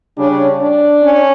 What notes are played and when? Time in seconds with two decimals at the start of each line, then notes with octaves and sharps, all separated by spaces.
0.18 C#3 G3 C#4 D4
0.61 D4
1.03 C#4